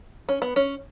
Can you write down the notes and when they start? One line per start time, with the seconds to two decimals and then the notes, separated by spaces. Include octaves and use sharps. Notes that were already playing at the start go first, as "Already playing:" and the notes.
0.29 C#4
0.42 B3
0.56 C#4